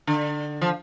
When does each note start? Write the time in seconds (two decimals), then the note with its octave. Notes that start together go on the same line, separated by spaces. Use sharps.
0.07 D3
0.61 F3